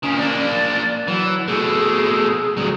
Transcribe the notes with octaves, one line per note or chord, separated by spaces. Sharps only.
A#2 D#3 C#4
A#3 D4 D5
E3 F#3
B2 A3 G#4
D2 F#3 G3